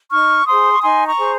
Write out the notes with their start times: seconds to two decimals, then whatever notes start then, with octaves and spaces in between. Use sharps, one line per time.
0.12 D#4 C#6 F6
0.47 G#4 C5 C6 D#6
0.72 C#6
0.83 D#4 G#5 C6
1.07 A#5 C#6
1.19 G#4 C5